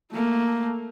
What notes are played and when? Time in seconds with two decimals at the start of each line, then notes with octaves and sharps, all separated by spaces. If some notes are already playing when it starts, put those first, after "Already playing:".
0.12 A3 A#3